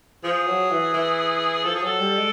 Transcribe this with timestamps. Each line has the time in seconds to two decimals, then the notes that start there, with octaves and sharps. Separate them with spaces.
0.23 F3 G#4
0.47 F#3
0.70 E3
0.94 E3
1.64 F3 A4
1.75 G#4
1.82 F#3 A4
1.99 G3
2.17 G#3